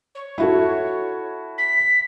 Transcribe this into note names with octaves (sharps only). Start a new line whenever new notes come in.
C#5
E4 F#4 A4
B6